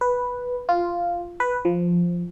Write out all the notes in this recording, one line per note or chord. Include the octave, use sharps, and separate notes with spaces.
B4
F4
B4
F3